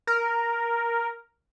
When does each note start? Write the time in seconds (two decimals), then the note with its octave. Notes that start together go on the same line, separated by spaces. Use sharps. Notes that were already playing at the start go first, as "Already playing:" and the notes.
0.07 A#4